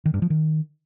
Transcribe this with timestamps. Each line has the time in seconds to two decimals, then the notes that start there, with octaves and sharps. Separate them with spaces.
0.05 D#3
0.14 G2
0.22 F3
0.30 D#3